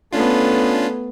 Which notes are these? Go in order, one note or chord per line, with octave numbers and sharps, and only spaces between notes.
A3 B3 C#4 D4 F4